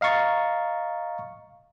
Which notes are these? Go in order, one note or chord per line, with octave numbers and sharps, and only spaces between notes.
D#5 F5 A#5 C#6 A6